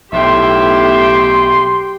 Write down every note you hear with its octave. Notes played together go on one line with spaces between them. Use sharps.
B1 A2 G4 E5 G5 C6